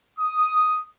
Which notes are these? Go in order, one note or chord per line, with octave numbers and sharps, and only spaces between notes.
D#6